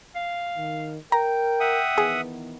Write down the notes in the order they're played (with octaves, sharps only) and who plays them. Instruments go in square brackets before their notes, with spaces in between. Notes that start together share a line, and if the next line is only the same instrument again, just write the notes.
[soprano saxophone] F5
[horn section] D#3
[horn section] A#4 [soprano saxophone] G5 [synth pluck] A#5
[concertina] E5 F#5 D#6
[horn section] D#3 E3 B3 [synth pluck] G#4